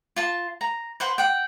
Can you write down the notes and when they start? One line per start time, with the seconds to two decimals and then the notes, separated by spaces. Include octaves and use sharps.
0.16 F4 A5
0.61 A#5
1.00 B4 C5 F#5
1.18 F#5 G5